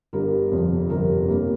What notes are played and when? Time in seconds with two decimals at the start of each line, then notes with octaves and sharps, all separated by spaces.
0.13 G1 G2 G3 A#4
0.51 G1 F2 C3
0.90 G1 F2 C3 A#4
1.28 G2 G3 A#3